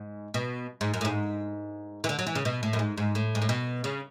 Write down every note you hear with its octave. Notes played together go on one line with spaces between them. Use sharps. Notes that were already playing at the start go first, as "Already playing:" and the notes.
Already playing: G#2
B2
G#2
F#2
A2
G#2
E3
D3
F#3
E3
C#3
B2
A2
F#2
G#2
G#2
A2
G#2
A2
B2
C#3